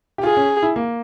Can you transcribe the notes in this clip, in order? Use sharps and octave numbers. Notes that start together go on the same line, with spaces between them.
G4
F4 G#4
C#4
E4
A#3